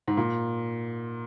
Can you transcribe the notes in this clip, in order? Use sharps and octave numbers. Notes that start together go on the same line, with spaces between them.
G#2
A#2